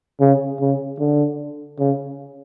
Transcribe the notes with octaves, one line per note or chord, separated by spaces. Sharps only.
C#3
C#3
D3
C#3